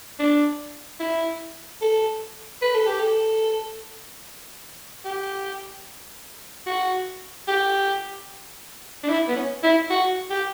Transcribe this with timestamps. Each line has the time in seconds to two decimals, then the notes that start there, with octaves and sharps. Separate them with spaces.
0.19 D4
1.00 E4
1.81 A4
2.62 B4
2.75 A4
2.87 G4
3.00 A4
5.05 G4
6.67 F#4
7.48 G4
9.03 D4
9.09 E4
9.28 B3
9.36 C#4
9.63 E4
9.90 F#4
10.30 G4